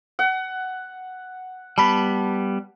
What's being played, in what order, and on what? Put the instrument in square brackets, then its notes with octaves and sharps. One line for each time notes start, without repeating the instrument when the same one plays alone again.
[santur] F#5
[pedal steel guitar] G3 B3 [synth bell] A5 B5 B6